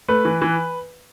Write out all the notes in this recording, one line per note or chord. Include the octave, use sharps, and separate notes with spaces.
A3 B4
E3
E3